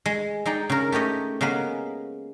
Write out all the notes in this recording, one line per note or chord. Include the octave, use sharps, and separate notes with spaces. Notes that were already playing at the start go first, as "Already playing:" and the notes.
G#3
G#3 D#4 D5 G5
C#3 A#4
A3 G4 C#5 D#5
C#3 G#3 A#3 B3 B4